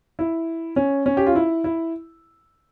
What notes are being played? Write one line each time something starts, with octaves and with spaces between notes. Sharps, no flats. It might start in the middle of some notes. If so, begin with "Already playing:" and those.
E4
C#4
C#4
G4
F4
E4
E4